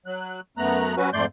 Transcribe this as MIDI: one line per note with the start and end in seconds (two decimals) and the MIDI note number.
0.06 0.40 54
0.06 0.40 90
0.57 0.95 42
0.57 0.95 57
0.57 0.95 59
0.57 0.95 82
0.57 0.95 90
0.97 1.10 54
0.97 1.10 61
0.97 1.10 66
0.97 1.10 71
1.13 1.25 41
1.13 1.25 44
1.13 1.25 57
1.13 1.25 74
1.13 1.25 84
1.13 1.25 91